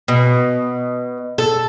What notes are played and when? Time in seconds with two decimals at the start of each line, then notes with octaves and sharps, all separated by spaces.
0.08 B2
1.38 A4